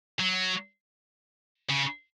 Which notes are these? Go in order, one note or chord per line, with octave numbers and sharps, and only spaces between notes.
F#3
C#3